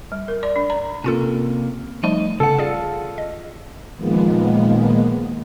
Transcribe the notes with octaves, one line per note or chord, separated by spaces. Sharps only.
G3
A#4
D5
D4
A#5
C3 A#3 C#4 F4 A4
F3 G3 A3 D#4
C#3 A4 F#5
F4 G#4 D5 F5
D#5
A#2 D#3 F3 G#3 A#3 B3